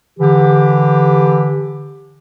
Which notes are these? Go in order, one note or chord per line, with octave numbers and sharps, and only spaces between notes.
D3 E3 G4